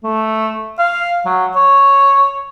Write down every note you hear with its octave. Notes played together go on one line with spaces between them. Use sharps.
A3
F5
F#3
C#5